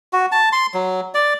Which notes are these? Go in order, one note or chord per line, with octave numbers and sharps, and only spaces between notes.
F#4
A5
C6
F#3
D5